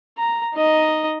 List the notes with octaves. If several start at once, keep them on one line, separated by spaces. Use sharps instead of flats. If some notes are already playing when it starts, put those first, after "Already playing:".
A#5
D#4 D#5